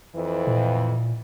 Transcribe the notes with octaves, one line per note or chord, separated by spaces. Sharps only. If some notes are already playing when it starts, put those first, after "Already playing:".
F2 E3
A#2